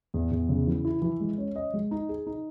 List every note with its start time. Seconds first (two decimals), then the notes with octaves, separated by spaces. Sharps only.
0.14 E2
0.31 E2
0.49 C#3
0.67 E3
0.85 E4
1.02 E3
1.20 G#3
1.38 C#4
1.56 D#5
1.74 G#3
1.91 D#4
2.09 G#4
2.27 D#4